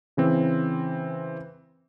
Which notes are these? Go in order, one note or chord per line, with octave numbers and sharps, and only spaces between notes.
C#3 E3 C4